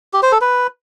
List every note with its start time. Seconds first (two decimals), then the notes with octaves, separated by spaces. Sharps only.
0.14 G4
0.23 C5
0.32 A4
0.41 B4